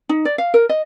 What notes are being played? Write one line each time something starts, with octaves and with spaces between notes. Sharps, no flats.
D#4
D5
F5
A#4
D#5